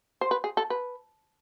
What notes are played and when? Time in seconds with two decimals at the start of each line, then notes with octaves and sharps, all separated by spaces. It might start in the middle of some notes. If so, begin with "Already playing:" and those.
0.21 C5
0.31 B4
0.44 G#4
0.57 A4
0.70 B4